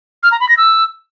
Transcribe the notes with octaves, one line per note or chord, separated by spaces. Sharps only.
F6
A#5
B5
A#6
E6